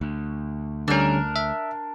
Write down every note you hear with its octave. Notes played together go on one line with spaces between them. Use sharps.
D2
D3 G3 C#4 D4 A#4
E5